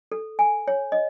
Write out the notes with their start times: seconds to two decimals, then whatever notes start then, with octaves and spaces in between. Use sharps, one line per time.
0.12 A4
0.39 G#5
0.68 C#5
0.92 D#5